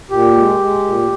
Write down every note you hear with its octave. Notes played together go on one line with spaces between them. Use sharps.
A#2 G4
G#3
G#3
A#2